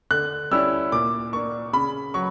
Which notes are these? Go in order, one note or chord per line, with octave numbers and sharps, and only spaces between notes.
D3 F#6
G3 C#4 E4 E6
A#2 D6
A#3 D4 C#6
C#3 B5
F#3 C#6